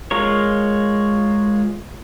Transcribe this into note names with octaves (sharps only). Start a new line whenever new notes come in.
G#3 F4 A#4 C#5